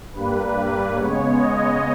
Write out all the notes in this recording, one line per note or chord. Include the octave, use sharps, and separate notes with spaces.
G2 G3 A#3 B4
C#3 G#3 B3 C#5
D#5